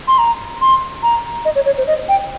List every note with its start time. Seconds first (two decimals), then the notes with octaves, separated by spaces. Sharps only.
0.08 C6
0.18 A#5
0.61 C6
1.03 A#5
1.45 D#5
1.55 C#5
1.66 C#5
1.77 C5
1.87 D#5
2.09 G5